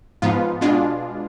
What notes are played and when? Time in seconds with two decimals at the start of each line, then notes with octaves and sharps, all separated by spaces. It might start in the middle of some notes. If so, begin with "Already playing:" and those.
0.22 G#2 F3 B3 F4
0.61 B2 G#3 D4 F4